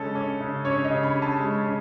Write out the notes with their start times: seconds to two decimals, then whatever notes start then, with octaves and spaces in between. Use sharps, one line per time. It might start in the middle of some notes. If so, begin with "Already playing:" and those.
Already playing: C#3 G#3 C#4 A4
0.15 C#4
0.41 C#3
0.65 C#4 C#5
0.84 D#5
0.90 C#3
1.03 B5
1.15 C#4
1.22 A5
1.40 G#3
1.65 C#4